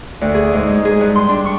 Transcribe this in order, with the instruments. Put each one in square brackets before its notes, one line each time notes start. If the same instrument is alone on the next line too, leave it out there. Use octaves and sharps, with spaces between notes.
[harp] D2
G#4
G#2
G#3
G#4
G2
C6
D4
C#6